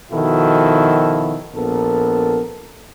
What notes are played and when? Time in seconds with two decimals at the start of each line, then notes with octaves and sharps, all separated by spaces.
0.12 B2 D#3 F3 E4 F#4 A4
1.55 A#1 B3 A4 A#4